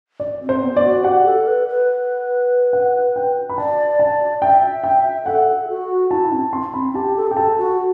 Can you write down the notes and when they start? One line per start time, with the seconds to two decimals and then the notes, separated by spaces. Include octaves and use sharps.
0.20 D5
0.42 C4
0.49 C5
0.63 B3
0.77 D5
0.84 F#4
1.04 G4 F#5
1.26 A4
1.47 B4
1.68 B4
2.73 F#5
3.16 G5
3.49 B5
3.58 D5 A5
4.00 A5
4.42 E5 G5
4.84 G5
5.26 A4 F#5
5.69 F#4
6.11 E4 A5
6.32 C4 A5
6.53 C6
6.73 C4 B5
6.95 G4 A5
7.17 A4
7.27 G4 G5
7.37 A4 A5
7.58 F#4